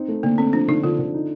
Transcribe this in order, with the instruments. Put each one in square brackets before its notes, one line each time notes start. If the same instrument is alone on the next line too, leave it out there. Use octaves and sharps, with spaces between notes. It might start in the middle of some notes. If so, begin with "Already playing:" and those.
Already playing: [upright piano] C4 D#4
A3
[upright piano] D3 [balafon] A#3
[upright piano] A3 [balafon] C4
[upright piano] F3 [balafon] D4
[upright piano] D3 [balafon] D#4
[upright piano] D3 [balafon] F4
[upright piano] D3
D#4